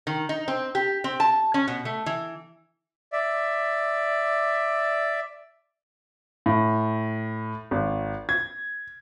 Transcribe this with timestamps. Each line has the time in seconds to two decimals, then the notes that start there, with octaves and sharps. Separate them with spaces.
0.07 D#3
0.29 D#4
0.48 C4
0.75 G4
1.04 C4
1.20 A5
1.54 C#4
1.68 B2
1.85 A3
2.06 E3
3.13 D5 E5
6.46 A2
7.71 G#1
8.29 G#6